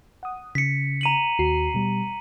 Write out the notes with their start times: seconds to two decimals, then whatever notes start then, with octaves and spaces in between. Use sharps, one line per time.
0.23 F#5 D#6
0.55 C#3 B6 C#7
1.01 A#5 D#7 F#7
1.39 D#2 F#4 C7
1.74 B2 G3